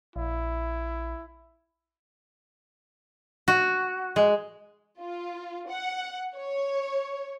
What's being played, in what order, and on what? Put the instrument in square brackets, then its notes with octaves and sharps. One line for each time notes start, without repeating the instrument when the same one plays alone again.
[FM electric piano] A#1 [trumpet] E4
[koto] F#4
G#3
[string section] F4
F#5
C#5